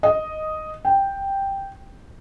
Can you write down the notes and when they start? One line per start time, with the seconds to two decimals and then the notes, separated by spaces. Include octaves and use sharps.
0.03 D#5
0.85 G5